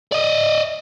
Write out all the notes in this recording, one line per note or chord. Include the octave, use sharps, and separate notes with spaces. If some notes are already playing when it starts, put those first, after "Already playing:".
D5 D#5